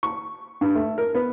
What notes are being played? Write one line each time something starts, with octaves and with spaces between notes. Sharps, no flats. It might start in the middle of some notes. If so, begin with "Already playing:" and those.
C#6
G2
A3
A#4
B3